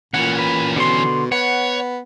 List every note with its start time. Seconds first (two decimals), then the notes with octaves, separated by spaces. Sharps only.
0.14 A#2 E3 C#4 F#5
0.38 B4
0.76 B2 D3 C6
1.32 B3 C#5 F#5